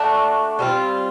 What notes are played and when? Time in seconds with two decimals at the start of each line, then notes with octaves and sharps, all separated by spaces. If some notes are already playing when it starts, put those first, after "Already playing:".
Already playing: A3 D4 F#4
0.59 G3 C4 F4